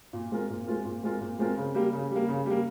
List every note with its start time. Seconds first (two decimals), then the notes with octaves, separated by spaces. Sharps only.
0.13 A#2
0.31 G#3 C4 F4 A#4
0.50 A#2
0.67 G#3 C4 F4 A#4
0.85 A#2
1.03 G#3 C4 F4 A#4
1.21 A#2
1.39 G#3 C4 F4 A#4
1.57 C#3
1.75 G3 A#3
1.93 C#3
2.11 G3
2.16 A#3
2.29 C#3
2.46 G3 A#3